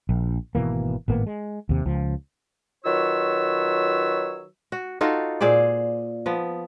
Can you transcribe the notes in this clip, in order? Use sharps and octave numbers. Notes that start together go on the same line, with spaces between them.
A#1
G#1 B2 E3 A#3
G#1 A2 A#3 B3
G#3
D#2 C3
C#2 F3
D#3 F#3 F4 B4 C#5 E6
F#4
D#4 F4 F#4 A4
A#2 G#4 C5 D5
F3 B3